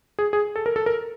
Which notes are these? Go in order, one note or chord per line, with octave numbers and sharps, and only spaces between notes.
G#4
G#4
A4
A#4
A4
A#4